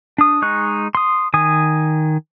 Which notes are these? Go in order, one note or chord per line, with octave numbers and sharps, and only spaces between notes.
D4 D#6
G#3 D#4 C#6 F#6
C6 D#6
D#3 G#5 D#6